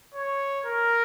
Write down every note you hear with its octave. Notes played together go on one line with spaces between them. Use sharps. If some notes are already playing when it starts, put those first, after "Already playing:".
C#5
A#4